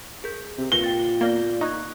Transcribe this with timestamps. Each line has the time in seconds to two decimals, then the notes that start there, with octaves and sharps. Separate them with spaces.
0.24 G#4 A#4 G6
0.58 C3
0.72 A#2 B4 A#6 C#7 G7
0.84 G5 A6
1.21 A#3 B3 D5 A#6
1.61 D#4 C#6 F#6 G#6